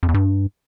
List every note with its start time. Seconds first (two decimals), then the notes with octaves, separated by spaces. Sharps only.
0.03 F2
0.08 E2
0.14 G2